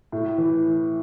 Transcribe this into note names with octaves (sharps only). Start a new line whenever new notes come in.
A2
E3